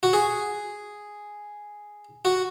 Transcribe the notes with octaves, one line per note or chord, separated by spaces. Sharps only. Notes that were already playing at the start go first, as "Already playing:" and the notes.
F#4
G#4
F#4